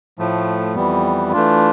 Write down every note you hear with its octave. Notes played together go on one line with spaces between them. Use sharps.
A2 F3 A3
F2 E3 G3 B3
E3 A3 D4 F4